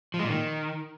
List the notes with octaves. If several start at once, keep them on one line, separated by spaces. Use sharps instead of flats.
F3
G#3
A#2
D#3